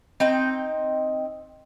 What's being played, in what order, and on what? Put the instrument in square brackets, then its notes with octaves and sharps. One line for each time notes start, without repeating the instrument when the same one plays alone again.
[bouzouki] C4 D#4 G5